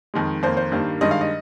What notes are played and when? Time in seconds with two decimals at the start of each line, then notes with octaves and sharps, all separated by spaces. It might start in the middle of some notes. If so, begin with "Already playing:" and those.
0.14 F2 D#3 G#3
0.43 F2 D#3 A#3 C5
0.57 C5
0.72 G2 D#3 G3 A#3
1.01 G2 D#3 G#3 D#5
1.11 F5
1.21 D#5